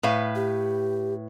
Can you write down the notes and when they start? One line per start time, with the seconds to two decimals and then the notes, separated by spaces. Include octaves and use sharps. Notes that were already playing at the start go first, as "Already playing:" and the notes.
0.03 A2 B4 F5
0.35 G4